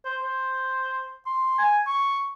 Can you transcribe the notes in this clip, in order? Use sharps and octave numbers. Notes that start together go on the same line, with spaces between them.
C5
C5
C6
G#5
C#6